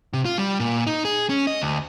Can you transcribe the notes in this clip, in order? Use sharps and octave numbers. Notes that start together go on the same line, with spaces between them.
C3
F4
G3
A#2
D#4
G#4
C#4
D#5
D2